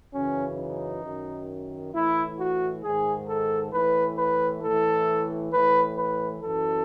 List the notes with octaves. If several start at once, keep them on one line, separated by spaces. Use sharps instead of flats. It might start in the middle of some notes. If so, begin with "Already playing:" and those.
F#2 C#3 E3 C#4
D#4
F#2 D#3
A2 E3 E4
F#4
G#2 D#3 G#4
A4
A2 E3 B4
B4
A2 E3 A4
A2 E3 B4
B4
F#2 E3 A4